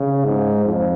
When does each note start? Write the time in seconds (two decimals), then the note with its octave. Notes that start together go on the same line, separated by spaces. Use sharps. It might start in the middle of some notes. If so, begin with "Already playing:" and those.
Already playing: C#3
0.25 G#2
0.65 F2